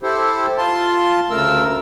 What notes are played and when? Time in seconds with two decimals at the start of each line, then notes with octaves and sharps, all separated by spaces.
0.03 E4 G4 A4 C5
0.58 F4 A5 C6
1.31 D2 C#3 A3 A#4 E6